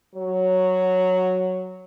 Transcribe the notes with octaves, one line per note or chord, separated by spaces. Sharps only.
F#3 C#5